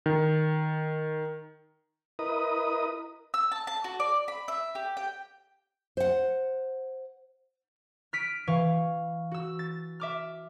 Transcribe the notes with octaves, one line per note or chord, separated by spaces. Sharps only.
D#3
E4 A#4 B4 D#5 D#6
E6
A5
A5
F#4
D5
B5
E5
G4
G5
C5 F#5
F6 B6 D7 D#7
E3 F5 C#6
F#4 E6
A6
E5 D6 F6